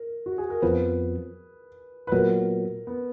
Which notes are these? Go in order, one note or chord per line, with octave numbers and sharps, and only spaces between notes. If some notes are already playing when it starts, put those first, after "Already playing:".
Already playing: A#4
F#4
G#4
A#4
F2 F3 B3 B4
B4
A#2 F#3 B3 A#4
B3